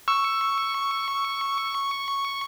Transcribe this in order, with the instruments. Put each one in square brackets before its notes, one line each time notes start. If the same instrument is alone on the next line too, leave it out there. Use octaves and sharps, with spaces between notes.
[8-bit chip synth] C#6 [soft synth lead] E6